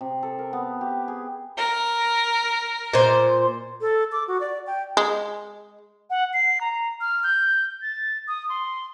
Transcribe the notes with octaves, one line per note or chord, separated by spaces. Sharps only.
C3
A4
A#4
B3
G4
G#4
A#4
A#2 C5
A4
D6
F#4
D5
G5
G#3
F#5
C7
A#5
F6
G6
A6
D#6
C6